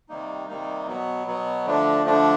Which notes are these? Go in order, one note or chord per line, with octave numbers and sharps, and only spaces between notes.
C3 D#3 G3 A#3 D#4
C3 D#3 G3 A#3 D#4
B2 F#3 B3
B2 F#3 B3
D3 F3 A3 D4
D3 F3 A3 D4